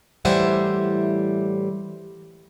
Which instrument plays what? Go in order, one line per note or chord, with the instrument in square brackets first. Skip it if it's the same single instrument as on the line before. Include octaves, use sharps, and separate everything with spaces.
[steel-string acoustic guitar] A2 E3 G3 C5 E5 F#5